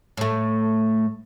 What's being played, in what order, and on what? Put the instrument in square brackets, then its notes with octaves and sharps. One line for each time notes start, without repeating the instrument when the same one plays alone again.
[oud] A2 A3